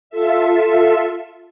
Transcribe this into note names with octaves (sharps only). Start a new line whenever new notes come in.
F4 A4 E5